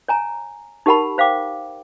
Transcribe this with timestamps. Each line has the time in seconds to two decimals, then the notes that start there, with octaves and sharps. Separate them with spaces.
0.08 C#5 G#5 A#5
0.86 D#4 G4 A#4 F#5 A5 B5
1.18 C5 F5 G5 D6